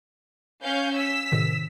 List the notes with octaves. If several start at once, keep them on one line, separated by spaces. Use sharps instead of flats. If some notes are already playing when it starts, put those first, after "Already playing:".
C#4 F5 G6
E6 B6
A2 C3 D#3